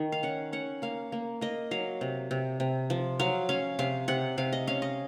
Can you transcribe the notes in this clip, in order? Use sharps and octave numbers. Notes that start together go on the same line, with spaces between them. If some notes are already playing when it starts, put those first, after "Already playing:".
Already playing: D#3
F5
C#4 F#5
C#4 F#5
A#3 F5
A#3
A#3 D#5
F#3 F5
C3
C3
C3
F3
F#3 F5
C#4 F5
C3 F5
C3 F#5
C3 F5
D#5
C#4 F5
D#5